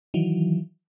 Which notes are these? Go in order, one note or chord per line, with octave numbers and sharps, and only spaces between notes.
D#3 E3 F#3